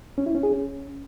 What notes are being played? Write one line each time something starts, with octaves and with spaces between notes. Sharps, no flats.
C#4
E4
C#4
G#4
C#4